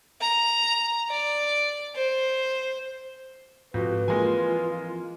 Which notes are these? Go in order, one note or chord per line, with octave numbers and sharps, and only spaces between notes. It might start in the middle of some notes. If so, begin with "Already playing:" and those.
A#5
D5
C5
F2 G#2 C4 F#4 G4 B4
E3 F3 G#3 A#3 C4 F4 G#5